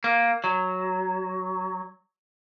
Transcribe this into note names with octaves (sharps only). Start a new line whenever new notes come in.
A#3
F#3